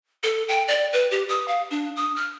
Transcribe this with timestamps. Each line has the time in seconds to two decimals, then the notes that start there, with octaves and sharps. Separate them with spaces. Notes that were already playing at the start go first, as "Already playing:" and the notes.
0.23 A4
0.48 G5
0.68 D5
0.93 B4
1.11 G4
1.29 D#6
1.48 F5
1.71 D4
1.96 D#6
2.16 F6